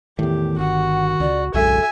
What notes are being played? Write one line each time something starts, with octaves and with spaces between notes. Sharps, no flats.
E2 A2 D#3 G4
G1 F#4 F#5
C#2 D5
D1 B1 F#2 G#3 A4 E5 G#5